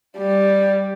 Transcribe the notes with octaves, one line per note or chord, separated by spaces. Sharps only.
G3